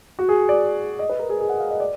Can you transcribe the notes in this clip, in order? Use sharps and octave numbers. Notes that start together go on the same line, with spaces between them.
F#4
G#4
D5
D#5
B4
A#4
G#4
G#4
F#5
F5
D#5
D5